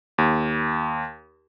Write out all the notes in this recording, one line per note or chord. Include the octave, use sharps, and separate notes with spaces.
D#2